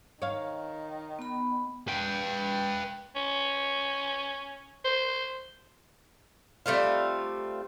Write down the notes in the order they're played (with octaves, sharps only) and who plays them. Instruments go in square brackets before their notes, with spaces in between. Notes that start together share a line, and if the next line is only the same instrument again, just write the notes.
[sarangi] D#3 [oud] C#5 F5
[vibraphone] B3 B5
[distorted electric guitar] B4 G5
[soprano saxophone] C#4
C5
[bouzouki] G3 A3 C4 F4